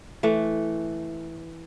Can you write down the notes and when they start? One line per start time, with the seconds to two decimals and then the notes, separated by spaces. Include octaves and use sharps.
0.23 E3 A3